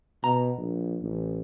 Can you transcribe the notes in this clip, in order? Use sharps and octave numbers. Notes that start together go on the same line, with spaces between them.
B2 A#5
A#1
A1